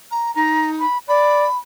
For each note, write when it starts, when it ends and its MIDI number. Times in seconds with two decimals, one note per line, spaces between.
0.11 0.31 82
0.35 0.85 63
0.35 0.66 82
0.80 0.98 83
1.08 1.44 74
1.08 1.58 83